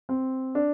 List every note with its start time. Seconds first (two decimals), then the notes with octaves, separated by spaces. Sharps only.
0.09 C4
0.55 D4